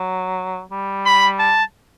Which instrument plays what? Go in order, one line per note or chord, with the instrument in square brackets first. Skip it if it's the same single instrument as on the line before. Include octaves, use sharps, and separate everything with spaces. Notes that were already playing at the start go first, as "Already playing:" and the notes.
Already playing: [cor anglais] F#3
G3
[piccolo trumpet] B5
A5